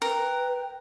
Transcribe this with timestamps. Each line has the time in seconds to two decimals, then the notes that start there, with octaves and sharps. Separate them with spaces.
0.02 A#4 B4 G5